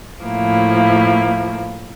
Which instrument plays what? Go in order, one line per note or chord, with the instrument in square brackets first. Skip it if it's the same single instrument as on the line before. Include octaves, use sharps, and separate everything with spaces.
[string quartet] A2 F3 A#3 E4